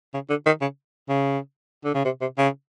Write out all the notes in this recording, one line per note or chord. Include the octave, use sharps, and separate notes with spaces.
C#3
D3
D#3
C#3
C#3
D3
C#3
C3
C3
C#3